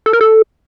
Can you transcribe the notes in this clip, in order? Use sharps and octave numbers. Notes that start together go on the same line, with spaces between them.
A4
A#4
A4